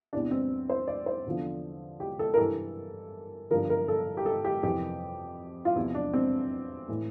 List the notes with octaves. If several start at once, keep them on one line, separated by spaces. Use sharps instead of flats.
E2 C3 E3 D4
C4
C5
D5
C5
E2 D3 F3
G4
A4
A#4
G2 E3 A4
G2 D3 F3 A#4
A#4
A4
G4
A4
G4
F2 C3 E3 G4
F4
E2 C3 F3 E4
D4
C4
A2 E3